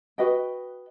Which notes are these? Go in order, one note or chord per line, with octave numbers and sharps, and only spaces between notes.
F#4 B4 D#5 G5